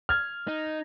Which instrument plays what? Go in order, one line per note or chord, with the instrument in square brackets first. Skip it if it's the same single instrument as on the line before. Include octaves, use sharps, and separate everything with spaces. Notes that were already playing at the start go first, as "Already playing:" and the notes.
[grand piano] F6 G#6
[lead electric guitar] D#4